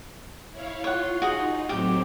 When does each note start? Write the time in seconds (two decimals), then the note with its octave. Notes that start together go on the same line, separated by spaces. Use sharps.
0.52 E4 C#5 F5
0.84 F4 C#5 F#5 C6
1.22 D#4 F#4 G#4
1.69 A2 F#3 C4 G4